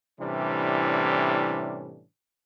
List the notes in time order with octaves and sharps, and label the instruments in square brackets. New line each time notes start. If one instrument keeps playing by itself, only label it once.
[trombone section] A2 C3 E3 G3 C#4 D4